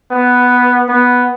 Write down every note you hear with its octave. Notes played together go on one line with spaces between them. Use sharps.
B3
B3